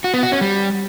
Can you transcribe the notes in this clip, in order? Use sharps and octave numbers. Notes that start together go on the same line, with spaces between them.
F#4
B3
F#4
C#4
G3